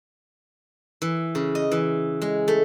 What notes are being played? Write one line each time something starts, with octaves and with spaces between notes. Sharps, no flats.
E3
C#3
D#5
E3
G#3
A3